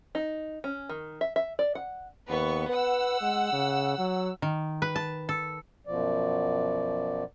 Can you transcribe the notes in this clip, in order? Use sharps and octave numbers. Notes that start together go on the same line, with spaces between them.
D#4
C#4
D#3
E5
E5
D5
F#5
D#2 B3 B4 C#6
B4 F#5 E6
G#3
C#3
F#3
D#3
B4
A5
A4
F#2 B2 F3 D5